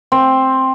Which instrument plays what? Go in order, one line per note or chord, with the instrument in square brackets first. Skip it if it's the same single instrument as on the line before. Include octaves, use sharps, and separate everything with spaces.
[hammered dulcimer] C4